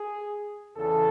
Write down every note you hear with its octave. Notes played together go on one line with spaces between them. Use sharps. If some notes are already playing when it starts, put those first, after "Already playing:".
Already playing: G#4
E2 C#3 E3 A4